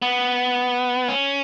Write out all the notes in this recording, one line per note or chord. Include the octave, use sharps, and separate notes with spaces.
B3
C#4